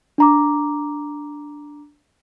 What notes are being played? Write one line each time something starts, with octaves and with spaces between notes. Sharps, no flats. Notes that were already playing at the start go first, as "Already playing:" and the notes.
D4 A#5 D6